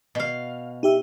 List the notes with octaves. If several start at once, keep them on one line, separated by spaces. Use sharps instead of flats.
B2 F5
D#4 G4 E5